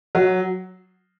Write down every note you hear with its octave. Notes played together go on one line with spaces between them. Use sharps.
F#3